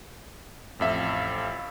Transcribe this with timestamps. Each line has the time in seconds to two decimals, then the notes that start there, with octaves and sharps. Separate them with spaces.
0.79 A1 F2 E5 F5